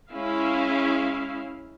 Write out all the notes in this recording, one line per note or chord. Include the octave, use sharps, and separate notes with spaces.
G#3 C#4 E4 F5